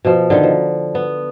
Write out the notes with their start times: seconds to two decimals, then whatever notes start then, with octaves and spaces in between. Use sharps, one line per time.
0.05 B2 F3
0.30 D3 D#3
0.43 F3
0.95 B3